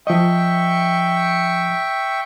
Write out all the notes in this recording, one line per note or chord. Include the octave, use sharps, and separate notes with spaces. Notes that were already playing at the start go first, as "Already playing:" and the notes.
F3 D#5 E5 G5 C#6